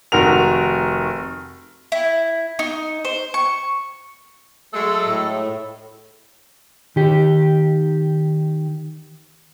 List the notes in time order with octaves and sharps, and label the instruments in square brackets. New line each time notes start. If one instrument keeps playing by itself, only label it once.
[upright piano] F1 D#3 F#4 A#4 F7
[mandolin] E4
D#4
C5
C#6
[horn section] F#3 G#3 A3 [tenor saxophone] A4
[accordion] A2
[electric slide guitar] D#3 G4